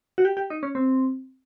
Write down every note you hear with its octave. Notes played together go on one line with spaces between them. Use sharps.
F#4
G4
G4
D#4
C#4
C4